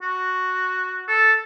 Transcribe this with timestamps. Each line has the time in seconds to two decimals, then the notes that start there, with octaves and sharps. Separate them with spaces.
0.02 F#4
1.08 A4